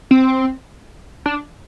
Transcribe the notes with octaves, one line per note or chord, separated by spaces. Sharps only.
C4
D4